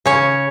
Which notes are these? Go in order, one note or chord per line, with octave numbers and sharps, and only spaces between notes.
C#3 C#5